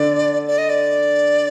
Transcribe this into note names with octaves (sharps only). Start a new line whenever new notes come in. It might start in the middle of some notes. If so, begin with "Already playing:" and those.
Already playing: D3 D5
D5
D#5
D5